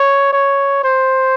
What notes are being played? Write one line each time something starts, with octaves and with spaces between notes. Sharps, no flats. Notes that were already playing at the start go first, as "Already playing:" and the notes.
Already playing: C#5
C#5
C5